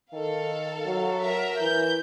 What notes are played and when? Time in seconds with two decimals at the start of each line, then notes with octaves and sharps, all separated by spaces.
0.13 D#3 A4 F5
0.86 F#3
1.24 A#4 E5 A#5
1.61 E3 G6